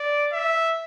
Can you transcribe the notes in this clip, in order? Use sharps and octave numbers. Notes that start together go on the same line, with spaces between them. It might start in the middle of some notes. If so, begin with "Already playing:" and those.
Already playing: D5
E5